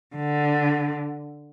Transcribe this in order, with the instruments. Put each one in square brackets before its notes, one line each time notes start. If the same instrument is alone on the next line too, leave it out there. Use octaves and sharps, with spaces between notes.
[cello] D3